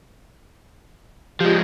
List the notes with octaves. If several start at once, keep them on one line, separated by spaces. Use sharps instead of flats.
F3 G#3 F4 G4 G6